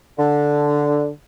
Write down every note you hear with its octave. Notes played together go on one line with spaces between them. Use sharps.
D3